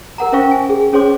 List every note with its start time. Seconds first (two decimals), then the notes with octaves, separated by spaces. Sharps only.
0.18 A#4 F#5 A#5
0.32 C#4 C5 E5 F5 G5 C#6
0.51 G#5
0.69 G#4
0.93 C#4 G#4 C5 C#5 C6 D6